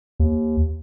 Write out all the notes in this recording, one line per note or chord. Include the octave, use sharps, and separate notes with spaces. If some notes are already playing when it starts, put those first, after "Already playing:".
D#2